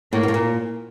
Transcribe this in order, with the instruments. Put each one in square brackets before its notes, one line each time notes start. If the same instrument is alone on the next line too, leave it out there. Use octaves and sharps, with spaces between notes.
[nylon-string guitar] A2 [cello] A#3
[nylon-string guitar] B2
A2
A#2